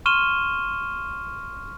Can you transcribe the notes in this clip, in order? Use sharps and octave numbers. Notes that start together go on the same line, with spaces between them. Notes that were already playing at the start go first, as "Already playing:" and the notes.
C6 C#6 F6 D#7 E7 G7